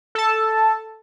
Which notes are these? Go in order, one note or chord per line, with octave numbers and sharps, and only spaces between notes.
A4 A5